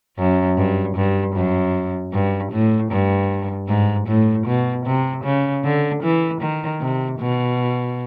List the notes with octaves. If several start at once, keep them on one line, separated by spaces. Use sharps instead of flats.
F#2
G2
G2
F#2
G2
A2
G2
G#2
A2
B2
C3
C#3
D3
E3
D#3
C3
B2